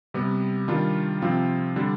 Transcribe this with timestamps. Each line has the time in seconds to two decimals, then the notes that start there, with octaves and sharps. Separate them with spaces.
0.14 C3 G3 B3
0.68 D#3 G3 D4 F4
1.22 C3 F3 C4 F4
1.76 D3 G3 D4